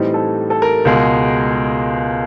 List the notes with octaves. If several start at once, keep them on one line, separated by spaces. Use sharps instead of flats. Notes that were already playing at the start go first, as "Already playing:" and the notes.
Already playing: A2 E3 G3 C4 D#4
A4
A4
A#4
C#2 B2 G#3